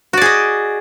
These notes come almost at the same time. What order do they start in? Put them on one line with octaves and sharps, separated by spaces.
F#4 D5 G#4 D#5